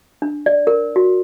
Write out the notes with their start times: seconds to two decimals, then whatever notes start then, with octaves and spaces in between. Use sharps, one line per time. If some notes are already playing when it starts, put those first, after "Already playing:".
0.22 D4
0.46 D5
0.67 A#4
0.96 F#4